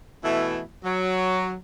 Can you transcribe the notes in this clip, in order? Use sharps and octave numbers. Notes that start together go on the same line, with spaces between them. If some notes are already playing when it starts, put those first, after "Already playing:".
B2 E3 A3 E4
F#3